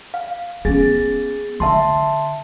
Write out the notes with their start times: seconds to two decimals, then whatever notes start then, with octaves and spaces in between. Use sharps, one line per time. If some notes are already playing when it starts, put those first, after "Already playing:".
0.14 F5
0.65 B3 C#4 G#4 A6
1.60 D3 E5 A5 C6